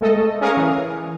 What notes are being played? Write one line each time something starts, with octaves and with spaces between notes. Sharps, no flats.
G#3 A3 A4 D#5
C#4 G#4 A#4 F5 C#6 D#6
E3